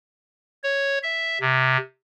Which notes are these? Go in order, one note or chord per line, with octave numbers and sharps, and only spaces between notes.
C#5
E5
C3